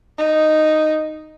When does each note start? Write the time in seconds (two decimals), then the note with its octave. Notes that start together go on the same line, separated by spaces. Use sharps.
0.18 D#4